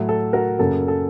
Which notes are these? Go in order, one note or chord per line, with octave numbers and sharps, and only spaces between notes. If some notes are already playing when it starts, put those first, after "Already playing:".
Already playing: A2 F#3 A3
A4
F#4 A#4
F#2 C#3 F#3 A#3 A4
A4